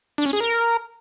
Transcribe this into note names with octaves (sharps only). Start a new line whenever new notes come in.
D4
C#4
G#4
A#4